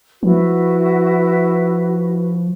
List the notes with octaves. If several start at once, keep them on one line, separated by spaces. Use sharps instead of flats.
F3 E4 F#4 B4